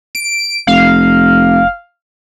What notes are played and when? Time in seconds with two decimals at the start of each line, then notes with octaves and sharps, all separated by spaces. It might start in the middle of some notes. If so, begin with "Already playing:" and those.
0.15 D7
0.67 F1 F5